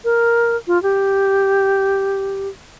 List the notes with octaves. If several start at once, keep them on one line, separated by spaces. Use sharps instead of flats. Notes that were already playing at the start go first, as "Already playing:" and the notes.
A#4
F4
G4